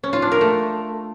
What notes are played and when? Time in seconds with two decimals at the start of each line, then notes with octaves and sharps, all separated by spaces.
0.03 C#4
0.13 F4
0.22 D4
0.32 A#4
0.41 A3